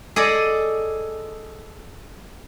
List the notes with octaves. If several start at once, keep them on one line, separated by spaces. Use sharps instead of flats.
G#4 A4 D5 D#5